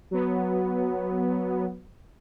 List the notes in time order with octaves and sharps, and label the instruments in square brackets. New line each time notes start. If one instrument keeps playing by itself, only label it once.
[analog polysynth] F#3 B3